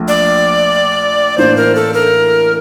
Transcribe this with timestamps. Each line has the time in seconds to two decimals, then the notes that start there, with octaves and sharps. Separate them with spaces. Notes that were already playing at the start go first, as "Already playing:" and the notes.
Already playing: A#1 A3
0.08 D5
1.37 A1 A2 E3 A#3 D4 C5
1.57 A#4
1.75 A4
1.94 A#4